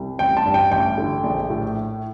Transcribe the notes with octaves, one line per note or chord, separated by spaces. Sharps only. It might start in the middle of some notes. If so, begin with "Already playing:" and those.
Already playing: C2
A1 G5
A5
G2
G5
A1 G5
D3
A#1
A2